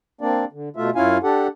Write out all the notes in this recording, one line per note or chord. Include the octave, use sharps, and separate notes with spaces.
A#3 C4 D4 D5
D3
B2 A3 F4 E5
F#2 C#4 E4 F4 F5 G#5
D4 G4 A4 F#5